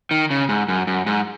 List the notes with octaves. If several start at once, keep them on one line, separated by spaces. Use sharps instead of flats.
D#3
C#3
G#2
F#2
F#2
G#2